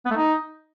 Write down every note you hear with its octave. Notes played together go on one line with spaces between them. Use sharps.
B3
A3
D#4